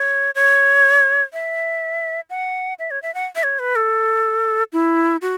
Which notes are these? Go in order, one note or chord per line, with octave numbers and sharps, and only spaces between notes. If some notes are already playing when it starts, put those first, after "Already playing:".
Already playing: C#5
C#5
E5
F#5
E5
C#5
E5
F#5
E5
C#5
B4
A4
E4
F#4